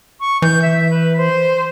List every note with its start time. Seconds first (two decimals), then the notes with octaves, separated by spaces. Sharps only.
0.20 C#6
0.42 E3 G6
0.62 E5
0.90 B4
1.17 C5